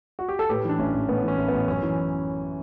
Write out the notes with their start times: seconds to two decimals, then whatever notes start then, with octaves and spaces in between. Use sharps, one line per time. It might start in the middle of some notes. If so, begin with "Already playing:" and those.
0.19 F#4
0.29 G4
0.39 A4
0.49 A2 G4 B4
0.64 E3 D4
0.79 A1 C#4
0.94 A1
1.08 A2 B3
1.24 E3 C#4
1.38 A1
1.48 B3
1.53 A1
1.68 F#2 C#4
1.83 E3